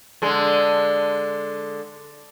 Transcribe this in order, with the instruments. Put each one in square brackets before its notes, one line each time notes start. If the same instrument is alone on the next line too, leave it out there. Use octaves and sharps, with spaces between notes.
[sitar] D3 G#3